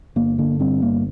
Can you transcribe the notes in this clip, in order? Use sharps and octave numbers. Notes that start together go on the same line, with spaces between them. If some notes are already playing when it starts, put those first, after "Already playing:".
G1 A#3
D3 A#3
G2 C4
G1 A#3